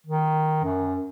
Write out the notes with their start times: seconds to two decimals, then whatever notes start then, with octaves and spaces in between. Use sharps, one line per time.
0.06 D#3
0.64 F#2